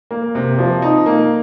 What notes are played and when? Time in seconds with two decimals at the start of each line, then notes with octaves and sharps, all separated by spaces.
0.11 A#3
0.35 C3
0.58 F3
0.82 D#4
1.06 A#3